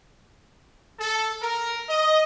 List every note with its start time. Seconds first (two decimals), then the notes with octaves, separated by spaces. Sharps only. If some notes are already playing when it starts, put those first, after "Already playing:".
0.99 A4
1.42 A#4
1.89 D#5